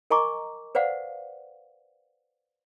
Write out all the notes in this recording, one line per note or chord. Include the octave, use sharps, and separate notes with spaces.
A#4 D#5 G#5 A#5 C#6 D6
B4 C5 D5 F5 F#5